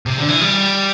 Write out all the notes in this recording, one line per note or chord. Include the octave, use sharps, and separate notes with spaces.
C3
D3
E3
G3